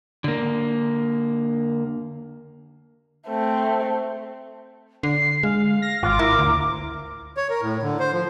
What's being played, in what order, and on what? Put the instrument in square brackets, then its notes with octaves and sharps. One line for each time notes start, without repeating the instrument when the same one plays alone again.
[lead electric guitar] D3 A#3
[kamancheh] A3 C4
[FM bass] D3 [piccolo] C7
[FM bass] G#3 [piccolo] F5
[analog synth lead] A#6
[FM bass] G#1 [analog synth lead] F4 [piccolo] D6
[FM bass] E4 [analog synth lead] A#4
[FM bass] D2
[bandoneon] C#5
A#4
A2
D3
C5
F3